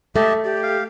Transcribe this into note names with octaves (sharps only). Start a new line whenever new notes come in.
A3 G4 D#5 E5 A5
G4 D5
F5